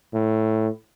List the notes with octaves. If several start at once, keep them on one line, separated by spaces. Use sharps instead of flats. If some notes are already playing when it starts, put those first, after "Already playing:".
A2